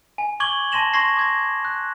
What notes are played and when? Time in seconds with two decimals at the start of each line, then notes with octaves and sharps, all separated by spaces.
0.18 G#5
0.40 C#6 D6 G#6 F#7 G7
0.72 A5 C6 A#6 E7 F#7
0.93 C6 C#6 G#6 A#6 C7
1.17 D6 G#6 A#6
1.65 F#6